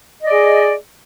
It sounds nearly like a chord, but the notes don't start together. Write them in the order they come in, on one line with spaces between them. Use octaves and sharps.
D#5 D5 G#4